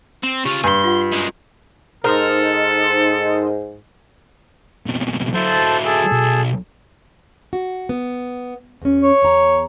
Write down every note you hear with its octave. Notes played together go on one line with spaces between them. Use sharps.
C4
C#3 F4 G4
G2 G#5 C6
F4 F#5
F#2 G#3
G#2 D#4 A4 A#4 C5 D#5
C#2 B2
F#3 E4 A4 C5 A5
G#4 A4 E6
B1
F#4
B3
E2 C#4
C#5
E2 A#5